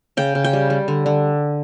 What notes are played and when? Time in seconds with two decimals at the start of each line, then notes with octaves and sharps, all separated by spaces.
0.17 C#3 G5
0.35 C#3
0.44 G5
0.53 G3
0.70 G3
0.88 D3
1.06 D3